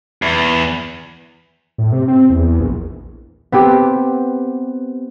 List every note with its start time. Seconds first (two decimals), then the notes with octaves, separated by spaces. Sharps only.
0.22 E2
1.78 A2
1.92 C3
2.08 C4
2.30 E2
2.60 A#1
3.52 B3 C4 G4